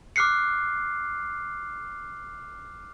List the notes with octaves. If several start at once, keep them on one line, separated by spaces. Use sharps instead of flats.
D6 F6 F#6 C7 C#7